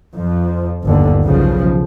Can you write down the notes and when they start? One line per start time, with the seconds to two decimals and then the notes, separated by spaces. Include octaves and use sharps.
0.14 F2 F3
0.84 G1 D#2 D3
1.24 B1 C#3 F3